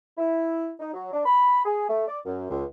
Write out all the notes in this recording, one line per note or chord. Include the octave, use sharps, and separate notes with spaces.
E4
D#4
F#3
D4
B5
G#4
A3
D5
F#2
C#2